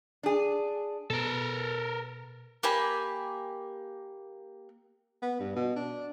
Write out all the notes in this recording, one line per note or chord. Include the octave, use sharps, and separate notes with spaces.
D4 G#4
B2 A4 A#4
A#3 G4 G#5 B5
B3
G2
B2
D4